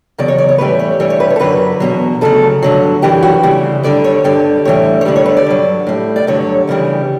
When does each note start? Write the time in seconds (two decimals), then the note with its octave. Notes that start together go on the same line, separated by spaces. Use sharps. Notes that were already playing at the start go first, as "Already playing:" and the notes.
0.18 E2 C#3 F#3 D5
0.28 C#5
0.38 D5
0.49 C#5
0.58 A2 E3 G3 B4
0.79 C#5
1.00 G2 E3 G3 C#5
1.10 C#5
1.20 B4
1.30 C#5
1.36 A4
1.40 F#2 D3 F#3 B4
1.80 E2 B2 F#3
2.21 D2 C#3 F#3 A4
2.63 G2 D3 F#3
3.02 F#2 E3 G3 G4
3.23 F#4
3.43 D2 C#3 E3 G3
3.83 F#2 D3 G3 D5
4.04 C#5
4.24 G2 D3 G3 D5
4.65 A2 E3 G3 C#5
5.01 C#5
5.05 F#2 D3 G3 D5
5.16 C#5
5.26 B4
5.37 D5
5.47 G2 F#3
5.87 A2 G3
6.16 D5
6.27 G2 D3 F#3 C#5
6.67 D2 C#3 E3 G3